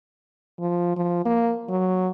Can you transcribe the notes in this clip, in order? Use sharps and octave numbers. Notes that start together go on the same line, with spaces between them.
F3
F3
A#3
F#3